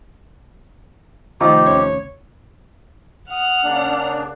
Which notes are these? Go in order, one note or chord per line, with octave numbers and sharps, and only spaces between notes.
C3 D#3 F3 A3 D#4 F4 G4
D#2 C#4 C#5 D6
F#5 D#6 F6
C#3 A#3 D4